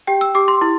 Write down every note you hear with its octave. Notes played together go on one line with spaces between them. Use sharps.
G4 G5
E6
G4 D6
C6
E4